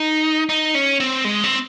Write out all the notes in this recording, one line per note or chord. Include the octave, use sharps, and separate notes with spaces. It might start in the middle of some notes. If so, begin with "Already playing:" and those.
Already playing: D#4
D#4
C#4
C4
G#3
C4